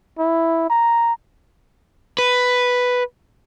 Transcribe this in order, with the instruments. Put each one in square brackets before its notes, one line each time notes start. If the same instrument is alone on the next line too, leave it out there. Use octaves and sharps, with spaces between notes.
[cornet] E4
A#5
[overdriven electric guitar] B4